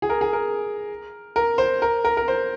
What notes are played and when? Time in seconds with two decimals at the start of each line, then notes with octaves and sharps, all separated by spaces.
0.02 G#4
0.09 A#4
0.21 G#4
0.33 A#4
1.36 A#4
1.58 C5
1.82 A#4
2.05 A#4
2.17 A#4
2.28 C5